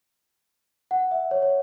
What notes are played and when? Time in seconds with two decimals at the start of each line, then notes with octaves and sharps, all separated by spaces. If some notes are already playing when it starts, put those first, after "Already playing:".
0.91 F#5
1.11 E5
1.31 C#5
1.42 C#5